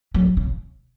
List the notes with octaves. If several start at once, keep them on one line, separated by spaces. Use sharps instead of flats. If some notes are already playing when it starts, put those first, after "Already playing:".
F#3
C#3